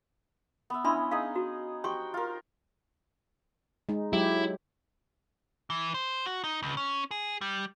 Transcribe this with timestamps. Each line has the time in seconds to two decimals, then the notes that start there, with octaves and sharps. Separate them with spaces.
0.70 B3 E5
0.84 C#4 D4 E4 D#5 B5 C6
1.11 D#4 G#4 F5 D#6
1.36 F#4
1.84 F#4 G4 C5 G5 C6 C#6
2.14 F4 A#4
3.89 G#3 D#4
4.13 F#3 G#3 E4 G4
5.70 E3
5.94 C5
6.26 F#4
6.44 D#4
6.63 C#2
6.77 C#4
7.11 G#4
7.41 G3